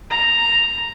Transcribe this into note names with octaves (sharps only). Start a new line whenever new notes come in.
A#5